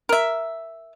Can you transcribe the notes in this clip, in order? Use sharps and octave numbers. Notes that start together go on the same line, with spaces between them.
A#4 E5